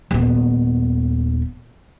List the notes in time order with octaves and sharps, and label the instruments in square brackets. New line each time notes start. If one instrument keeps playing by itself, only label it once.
[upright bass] D#1 B3